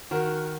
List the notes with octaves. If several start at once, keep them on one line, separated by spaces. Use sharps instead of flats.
D#3 F#4 A#4